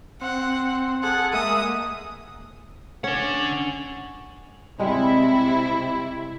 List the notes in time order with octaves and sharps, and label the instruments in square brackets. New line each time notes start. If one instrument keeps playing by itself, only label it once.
[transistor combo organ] C4 [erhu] F#5
[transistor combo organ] G#4 A4 [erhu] F#5
[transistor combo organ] G#3 A#3 E5 [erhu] D#6
[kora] C#4 [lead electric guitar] D4 F#5
[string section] C3 E4 [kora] G3 G#3